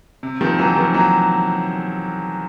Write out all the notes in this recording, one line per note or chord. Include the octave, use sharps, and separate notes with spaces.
C3
D#3 F3
E3 F#3
D#3 F3
E3 F#3